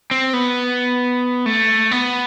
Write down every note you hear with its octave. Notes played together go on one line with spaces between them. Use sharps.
C4
B3
A3
B3